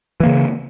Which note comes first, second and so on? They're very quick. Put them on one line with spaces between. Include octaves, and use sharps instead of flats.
E3 A#3 C#3